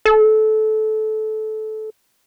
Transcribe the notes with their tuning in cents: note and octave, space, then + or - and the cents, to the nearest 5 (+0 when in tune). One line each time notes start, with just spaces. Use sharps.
A4 -20